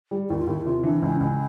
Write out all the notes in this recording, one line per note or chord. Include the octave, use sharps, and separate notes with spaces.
G3
D#2 E4
F4
D#2 E4
C3 F4
E3 D4
C#2 C#4
C#2 C#4